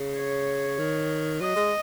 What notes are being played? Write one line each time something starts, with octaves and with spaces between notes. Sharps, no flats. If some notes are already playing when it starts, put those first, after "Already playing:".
Already playing: C#3
C#5
D#3
F#3 D#5
G#3